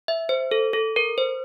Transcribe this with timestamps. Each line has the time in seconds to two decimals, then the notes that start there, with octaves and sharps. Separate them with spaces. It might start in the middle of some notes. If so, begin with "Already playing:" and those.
0.08 E5
0.29 C5
0.51 A4
0.73 A4
0.96 A#4
1.18 C5